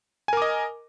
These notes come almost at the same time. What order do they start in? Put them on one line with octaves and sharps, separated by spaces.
G#5 A#4 D6 D#5